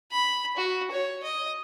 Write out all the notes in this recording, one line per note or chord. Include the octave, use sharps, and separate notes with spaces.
B5
F#4
C#5
D#5